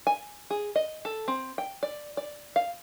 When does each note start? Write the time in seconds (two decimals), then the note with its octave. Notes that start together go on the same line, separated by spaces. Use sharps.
0.07 G#5
0.50 G#4
0.76 D#5
1.05 A4
1.28 C4
1.58 G5
1.83 D5
2.17 D5
2.56 F5